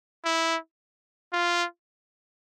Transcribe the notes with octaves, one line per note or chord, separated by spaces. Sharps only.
E4
F4